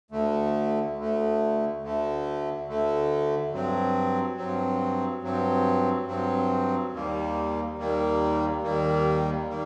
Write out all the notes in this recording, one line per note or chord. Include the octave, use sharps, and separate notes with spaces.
D2 D3 A3
D2 D3 A3
D2 D3 A3
D2 D3 A3
G2 F#3 C4
G2 F#3 C4
G2 F#3 C4
G2 F#3 C4
D#2 D#3 G3 A#3
D#2 D#3 G3 A#3
D#2 D#3 G3 A#3
D#3 G3 A#3